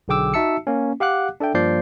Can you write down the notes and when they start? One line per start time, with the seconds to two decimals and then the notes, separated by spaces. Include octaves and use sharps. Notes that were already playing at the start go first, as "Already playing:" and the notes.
0.08 B1 D3 G#4 G5 D6 E6
0.34 D#4 F#4 E5 A5 E6 C#7
0.67 A#3 C#4
1.00 G4 F5 F#5 D6 F#6
1.40 D4 A4 E5 G5
1.54 G2 F3 A#3 D5 G6 C7